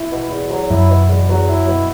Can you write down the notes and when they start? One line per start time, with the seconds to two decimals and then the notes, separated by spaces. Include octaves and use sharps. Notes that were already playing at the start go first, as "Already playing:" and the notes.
Already playing: E4
0.11 B2
0.30 E2
0.50 F#3
0.70 F#2 E4
0.90 B2
1.09 E2
1.29 F#3
1.48 E4
1.68 B2